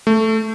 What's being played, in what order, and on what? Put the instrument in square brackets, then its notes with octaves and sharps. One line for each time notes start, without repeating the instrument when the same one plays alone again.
[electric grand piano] A3